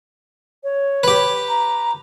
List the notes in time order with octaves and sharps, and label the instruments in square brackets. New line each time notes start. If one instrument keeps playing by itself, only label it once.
[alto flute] C#5
[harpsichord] G4 B4
[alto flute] A#5